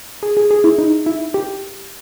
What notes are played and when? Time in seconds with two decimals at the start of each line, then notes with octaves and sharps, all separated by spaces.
0.23 G#4
0.37 G#4
0.51 G#4
0.64 E4
0.78 D#4
1.06 E4
1.34 G4